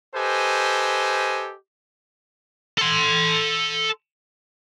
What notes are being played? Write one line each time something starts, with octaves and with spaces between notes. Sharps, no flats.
G4 A4 B4 C5 D#5 G#5
A4 C6